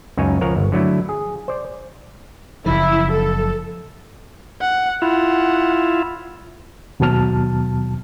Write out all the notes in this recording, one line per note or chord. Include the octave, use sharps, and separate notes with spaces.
C#2 F#2 D#4 C#5 G#5
C#2 F3 A#4 C#5 F#5
G1
D3 F#3 A3 E4
G#4
C5 D5
F#1 C#3 F3 E4
A4
F#5
E4 F4 F#5
D#2 B2 F#3 A5 F6